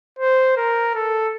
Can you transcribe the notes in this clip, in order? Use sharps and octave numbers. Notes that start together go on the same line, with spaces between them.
C5
A#4
A4